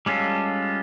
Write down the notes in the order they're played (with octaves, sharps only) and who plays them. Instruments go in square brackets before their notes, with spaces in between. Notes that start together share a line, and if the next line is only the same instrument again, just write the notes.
[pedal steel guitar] G3 G#3 C#4 F4 A4